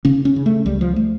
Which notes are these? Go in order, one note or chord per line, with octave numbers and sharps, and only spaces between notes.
C#3 C#4
C#4
C#3
A3
C#2 G3
F3
A3